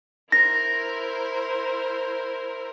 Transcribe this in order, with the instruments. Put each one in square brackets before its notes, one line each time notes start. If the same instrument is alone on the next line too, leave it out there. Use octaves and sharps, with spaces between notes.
[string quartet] E4 A#4 C5 [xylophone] A#6